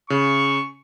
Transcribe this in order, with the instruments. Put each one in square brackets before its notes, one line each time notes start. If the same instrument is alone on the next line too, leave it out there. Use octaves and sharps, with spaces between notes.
[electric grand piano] C#3 [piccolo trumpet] C#6